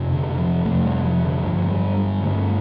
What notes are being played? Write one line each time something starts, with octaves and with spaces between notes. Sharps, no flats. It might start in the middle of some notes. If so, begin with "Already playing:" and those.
Already playing: F2 C3
D3
F3
F2 C3 A3
G3
F3
D3
G2 D3 F3
G3
G3
G2 D3 A3